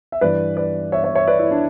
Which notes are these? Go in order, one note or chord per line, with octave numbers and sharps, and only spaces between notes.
E5
G2 E3 B4 D5
B4 D5
C#5 E5
C#5 E5
C#5 E5
B4 D5
E4
D4